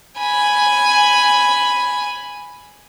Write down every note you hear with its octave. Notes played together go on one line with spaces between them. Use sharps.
G#5 B5